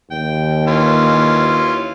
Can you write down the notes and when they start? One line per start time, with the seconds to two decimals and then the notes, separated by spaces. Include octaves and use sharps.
0.11 D#2 G5
0.67 E3 C#4 F4